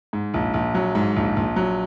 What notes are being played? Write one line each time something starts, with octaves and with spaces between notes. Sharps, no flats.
G#2
A#1
A#1
F#3
G#2
A#1
A#1
F#3